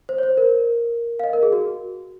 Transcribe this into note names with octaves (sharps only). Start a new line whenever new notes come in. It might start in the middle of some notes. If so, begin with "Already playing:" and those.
C5
C#5
C5
A#4
F5
D#5
A#4
G#4
F#4